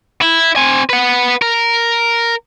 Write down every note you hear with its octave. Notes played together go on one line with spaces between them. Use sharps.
E4
C4 G#5
B4 F#5
A#4